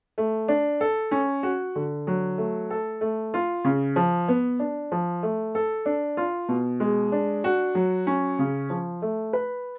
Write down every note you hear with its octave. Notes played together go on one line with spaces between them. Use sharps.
A3
D4
A4
C#4
F#4
D3
F#3
A3
A4
A3
F4
C#3
F3
B3
D4
F3
A3
A4
D4
F4
B2
G#3
D4
F#4
F#3
C#4
C#3
F3
A3
B4